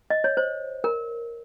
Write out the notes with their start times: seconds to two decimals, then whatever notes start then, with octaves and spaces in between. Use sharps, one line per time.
0.10 D#5
0.24 C#5
0.37 C5
0.84 A#4